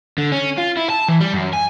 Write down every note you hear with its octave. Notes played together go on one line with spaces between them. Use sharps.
D3
C#4
F4
E4
A5
E3
G3
F#2
G#5